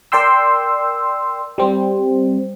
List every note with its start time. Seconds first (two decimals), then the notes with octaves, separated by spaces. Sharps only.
0.12 A#4 D5 G5 C6 E6
1.58 G3 C4